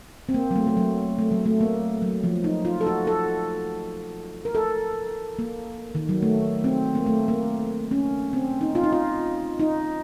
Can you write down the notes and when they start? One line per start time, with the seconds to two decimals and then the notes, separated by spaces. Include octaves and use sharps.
0.29 C4
0.34 A#3
0.51 F#3
0.56 A3
0.67 A3
0.77 F#3
1.18 A3
1.31 F#3
1.45 A3
1.61 A#3
2.02 F#3
2.24 F3
2.44 D#4
2.65 F4
2.81 A4
2.87 F#4
3.07 A4
4.45 A#4
4.55 A4
5.39 A#3
5.95 D#3
6.09 F#3
6.22 A3
6.64 C4
6.95 A#3
7.06 A3
7.28 A#3
7.91 C#4
8.33 C4
8.61 D#4
8.75 F4
8.84 D#4
8.93 F4
9.59 D#4